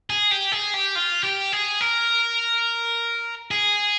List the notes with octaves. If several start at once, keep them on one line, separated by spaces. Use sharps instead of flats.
G#4
G4
G#4
G4
F4
G4
G#4
A#4
G#4